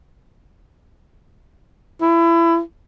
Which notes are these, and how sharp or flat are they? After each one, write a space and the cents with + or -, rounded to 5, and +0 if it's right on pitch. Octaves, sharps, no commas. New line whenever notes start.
E4 +25